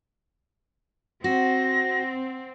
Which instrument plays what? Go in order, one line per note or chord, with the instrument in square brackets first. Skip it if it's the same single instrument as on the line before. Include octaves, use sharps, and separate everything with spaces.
[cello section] C4 [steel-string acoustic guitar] F#4 [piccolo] A#6